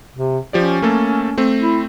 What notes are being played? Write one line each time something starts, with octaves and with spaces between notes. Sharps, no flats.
C3
F3 C#4 G4 D5
A3 A#3 A4
A3 C4
E4